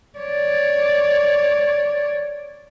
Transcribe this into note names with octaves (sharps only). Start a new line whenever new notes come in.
C#5 D5